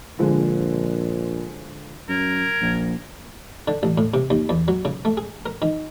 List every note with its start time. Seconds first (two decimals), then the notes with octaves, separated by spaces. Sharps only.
0.19 A#1 D3 F3 G#3
2.09 F#2 A#4 G#6
2.61 A#1
3.68 D3
3.83 A1
3.98 A2
4.14 C3
4.30 D#2
4.49 E2
4.68 F#3
4.85 C#3
5.05 A3
5.17 G#4
5.46 A#4
5.62 D#3